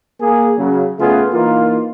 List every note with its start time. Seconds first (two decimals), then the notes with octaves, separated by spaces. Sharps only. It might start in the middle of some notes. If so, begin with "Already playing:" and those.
0.20 A#3 G#4
0.58 C#3 F#3
1.00 C#3 A3 B3 F4 G#4
1.33 E3 A#3 D#4 F4